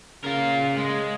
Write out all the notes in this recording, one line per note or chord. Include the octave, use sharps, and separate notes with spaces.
C#3 F4 A#4
G#3